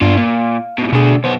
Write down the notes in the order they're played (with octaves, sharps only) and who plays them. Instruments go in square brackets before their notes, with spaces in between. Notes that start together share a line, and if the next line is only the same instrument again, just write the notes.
[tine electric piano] G2 B3 [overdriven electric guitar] D4 F4
[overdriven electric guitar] A#2 [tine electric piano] F5
[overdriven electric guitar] G#2 B2
[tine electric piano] B2 G#4 [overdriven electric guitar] A3 D4
[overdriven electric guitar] B1 B3 [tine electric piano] C5